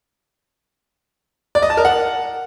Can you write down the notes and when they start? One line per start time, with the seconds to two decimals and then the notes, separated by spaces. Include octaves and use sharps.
1.55 D5
1.62 D#5
1.70 A5
1.77 A#4
1.85 F#5